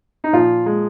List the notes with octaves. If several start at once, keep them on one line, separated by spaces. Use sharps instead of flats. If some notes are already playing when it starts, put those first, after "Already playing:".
D#4
A#2 F3 F4
G#3